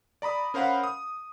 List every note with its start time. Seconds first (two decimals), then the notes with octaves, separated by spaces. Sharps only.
0.22 D5 A#5 B5 D#6
0.54 C#4 A#4 C5 F5 F#5 B5
0.84 D#6